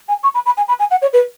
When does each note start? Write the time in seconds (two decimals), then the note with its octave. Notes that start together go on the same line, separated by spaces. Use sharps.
0.09 G#5
0.23 C#6
0.34 B5
0.46 B5
0.57 G#5
0.68 B5
0.80 G#5
0.91 F#5
1.02 C#5
1.13 B4